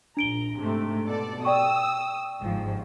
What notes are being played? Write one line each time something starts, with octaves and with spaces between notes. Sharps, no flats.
A#1 D4 A#5 D7 G7
G#2 C3 A3
B2 A4 D5
D5 G5 C#6 D#6 E6
G1 G#2 F3